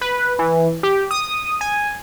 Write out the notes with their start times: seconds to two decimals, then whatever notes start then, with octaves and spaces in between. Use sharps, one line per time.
0.01 B4
0.39 E3
0.83 G4
1.11 D#6
1.61 G#5